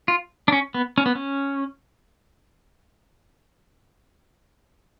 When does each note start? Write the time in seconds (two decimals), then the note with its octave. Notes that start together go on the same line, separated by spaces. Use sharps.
0.08 F4
0.48 D4
0.52 C#4
0.74 B3
0.98 C#4
1.06 B3
1.15 C#4